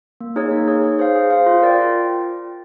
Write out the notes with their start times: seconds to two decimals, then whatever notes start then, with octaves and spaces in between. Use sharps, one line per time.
0.21 A#3
0.36 D#4 G#4 C#5
0.51 A#3
0.68 D#4 G#4 C#5
0.84 G#4
0.99 C5 F5
1.15 G#4
1.30 C5 F5
1.46 F4
1.62 A#4 D5 G5
1.78 F4